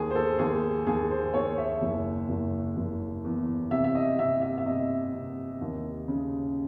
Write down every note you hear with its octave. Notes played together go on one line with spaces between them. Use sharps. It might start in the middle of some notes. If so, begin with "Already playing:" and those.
Already playing: D#2 G#4
C5
A4
D#2 G#4
D#2 G#4
C5
D#2 C#5
E5
F#1
F#1
F#1
E2
C3 E5
E5
D#5
C3 E5
E5
E5
C3 D#5
C3
D#2
C#3